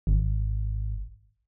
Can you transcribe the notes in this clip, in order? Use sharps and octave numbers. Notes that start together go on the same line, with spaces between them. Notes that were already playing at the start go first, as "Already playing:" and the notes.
G#1